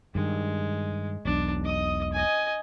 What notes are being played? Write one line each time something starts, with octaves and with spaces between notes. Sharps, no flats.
G2 D#3 G#3
E1 B1 D4
D#5 D#6
D#5 G#5